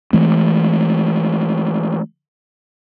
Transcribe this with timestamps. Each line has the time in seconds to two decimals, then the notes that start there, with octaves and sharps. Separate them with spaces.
0.13 E3 G#3 A3 C4